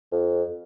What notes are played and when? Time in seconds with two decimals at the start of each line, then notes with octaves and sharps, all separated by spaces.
0.12 F2